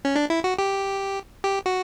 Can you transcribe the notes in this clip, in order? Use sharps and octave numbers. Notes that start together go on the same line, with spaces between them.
C#4
D4
E4
F#4
G4
G4
F#4